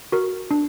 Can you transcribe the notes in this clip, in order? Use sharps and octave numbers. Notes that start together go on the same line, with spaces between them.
F#4 A#4
D4